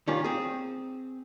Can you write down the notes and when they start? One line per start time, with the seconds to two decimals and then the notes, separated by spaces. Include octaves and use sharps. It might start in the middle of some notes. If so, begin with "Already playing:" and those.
0.07 D#3 G3 C#4 F4
0.24 C4 G#4